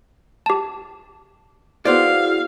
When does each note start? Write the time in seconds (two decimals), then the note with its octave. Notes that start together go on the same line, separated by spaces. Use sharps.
0.46 G4 A5
1.85 B3 E4 F#4 G#4 C5 D5 F5